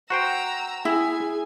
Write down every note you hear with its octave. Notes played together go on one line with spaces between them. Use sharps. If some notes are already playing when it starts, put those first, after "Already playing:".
F#4 C5 G5 A#5 E6
E4 G#4 G#5